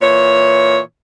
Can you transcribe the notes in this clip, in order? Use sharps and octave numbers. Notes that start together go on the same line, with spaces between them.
A#2 E3 C#5